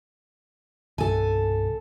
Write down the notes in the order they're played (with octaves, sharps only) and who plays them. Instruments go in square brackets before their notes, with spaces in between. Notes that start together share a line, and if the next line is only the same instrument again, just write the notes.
[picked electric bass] C2 G2 B2 [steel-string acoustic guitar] A4 G#5